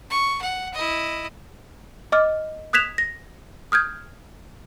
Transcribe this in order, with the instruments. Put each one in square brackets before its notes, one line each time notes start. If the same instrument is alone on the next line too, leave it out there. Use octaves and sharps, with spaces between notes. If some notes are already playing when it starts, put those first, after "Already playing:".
[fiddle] C#6
F#5
E4 D#5
[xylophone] D#5 D6 F6
D#6 F#6 G#6 B6 E7 F7
A#6
D#6 F6 G6 G#6